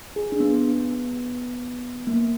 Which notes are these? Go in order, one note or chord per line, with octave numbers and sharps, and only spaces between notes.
G#4
D4
B3
A#3